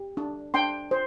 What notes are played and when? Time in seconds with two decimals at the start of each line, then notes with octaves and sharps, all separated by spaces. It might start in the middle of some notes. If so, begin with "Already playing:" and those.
Already playing: G4
0.17 D4
0.54 D4 G5 C6
0.91 C5